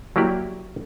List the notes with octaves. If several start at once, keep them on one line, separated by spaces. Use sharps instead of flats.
F#3 A#3 E4 G4 D5